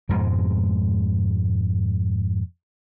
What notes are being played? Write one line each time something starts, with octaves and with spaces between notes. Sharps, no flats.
F2 G#2 B2 G#3